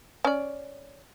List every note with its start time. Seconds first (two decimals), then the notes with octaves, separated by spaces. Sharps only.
0.25 C#4 D5